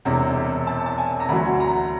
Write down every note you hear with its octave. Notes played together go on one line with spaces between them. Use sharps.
E1 E2 C3 A#5
A5
A5
G#5
A#5
D2 D3 F#3 B5
A#5